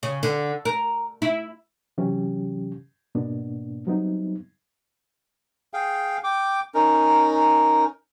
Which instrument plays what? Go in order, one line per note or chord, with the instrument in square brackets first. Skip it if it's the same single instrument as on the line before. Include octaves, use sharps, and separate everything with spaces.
[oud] C#3
D3
A#4
E4
[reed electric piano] C3 E3 F#3 C#4 G4
G#2 B2 A#3 B3 D4
F#3 G3 B3 C4 D#4 E4
[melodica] G#4 F5 G5
G5 D6
C#4 D#4 A#4